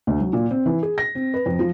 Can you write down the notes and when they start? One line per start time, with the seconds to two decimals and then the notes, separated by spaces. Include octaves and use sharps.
0.07 D2
0.21 F#3
0.33 A#2
0.51 C4
0.66 E3
0.83 G#4
0.98 A#6
1.15 C4
1.34 B4
1.46 F2
1.59 F3